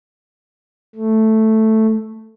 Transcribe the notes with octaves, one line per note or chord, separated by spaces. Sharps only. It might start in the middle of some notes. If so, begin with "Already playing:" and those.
A3